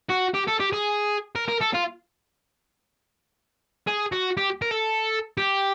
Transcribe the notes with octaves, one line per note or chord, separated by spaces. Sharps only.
F#4
G4
A4
G4
G#4
A#4
A#4
A4
F4
G#4
F#4
G4
A#4
A4
G4